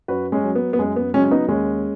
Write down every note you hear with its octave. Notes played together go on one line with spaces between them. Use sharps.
F#2 F#4 B4
G#3 C#4
F#3
B3
B3
F#2 G#3
B3
C#3 F#3 G#3 C#4
C#4
B3 D#4
D#2 G#3 C#4